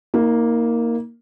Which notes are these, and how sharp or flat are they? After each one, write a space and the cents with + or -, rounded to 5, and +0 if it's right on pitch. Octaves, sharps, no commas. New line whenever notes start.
A#3 +0 D#4 +35